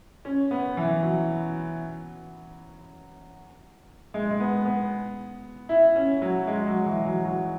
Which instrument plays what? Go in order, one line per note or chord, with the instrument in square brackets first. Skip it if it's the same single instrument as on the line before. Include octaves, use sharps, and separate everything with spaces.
[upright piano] C#4
B3
E3
F#3
G#3
G#3
B3
B3
E4
C#4
F#3
G#3
F#3
E3
F#3
F#3